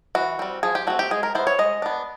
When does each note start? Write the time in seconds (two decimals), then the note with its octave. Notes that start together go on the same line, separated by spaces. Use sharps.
0.15 E3 F#4
0.39 G3 C4
0.63 F3 G#4
0.75 G4
0.87 A3 C4 F#4
0.99 G4
1.11 G#3 G#4
1.23 A#4
1.35 B3 E4 C5
1.47 C#5
1.59 G#3 D#5
1.82 B3 D4